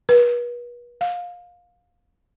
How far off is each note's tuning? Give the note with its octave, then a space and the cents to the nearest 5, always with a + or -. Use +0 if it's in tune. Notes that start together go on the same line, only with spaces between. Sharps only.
B4 -40
F5 +20